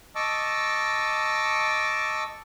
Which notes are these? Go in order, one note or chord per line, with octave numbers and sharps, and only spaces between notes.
D#5 A5 C#6 D6 E6